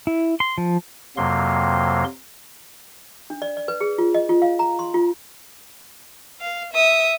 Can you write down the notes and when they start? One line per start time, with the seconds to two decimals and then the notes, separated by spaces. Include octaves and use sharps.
0.07 E4
0.40 C6
0.58 F3
1.17 F2 C3 F#3 A#3 C6
3.30 D4
3.42 D5
3.57 D5
3.68 B4
3.81 G#4
3.98 F4
4.14 D#5
4.29 F4
4.42 F5
4.59 A#5
4.79 C6
4.94 F4
6.41 F5
6.72 E5 D#6